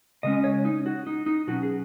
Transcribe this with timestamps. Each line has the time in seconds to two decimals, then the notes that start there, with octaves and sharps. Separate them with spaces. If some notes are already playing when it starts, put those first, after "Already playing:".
0.23 C#3 G#3 C#4 D#5
0.44 C#5
0.65 D#4
0.86 F#4
1.07 D#4
1.26 D#4
1.47 B2 F#3 C#4 F#4
1.63 G#4